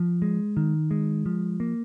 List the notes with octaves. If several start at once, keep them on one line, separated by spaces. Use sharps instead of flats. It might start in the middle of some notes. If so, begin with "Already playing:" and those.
Already playing: F3
G#3
D#3
G#3
F3
A#3